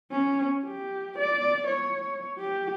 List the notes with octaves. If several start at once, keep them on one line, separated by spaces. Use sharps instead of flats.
C#4
G4
D5
C#5
G4